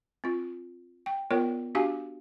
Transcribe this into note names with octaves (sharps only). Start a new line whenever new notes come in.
C4 F4
G5
B3 F4 A#4 C#5 D5 G5
D4 F#4 G4 F5 G#5